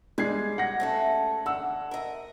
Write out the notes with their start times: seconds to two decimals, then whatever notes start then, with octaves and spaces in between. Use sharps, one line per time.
0.18 G3 G#3 G#6 C7
0.58 F#5 A#6
0.80 A3 C#4 A4
1.46 D3 F#5 E6
1.91 A#4 D#5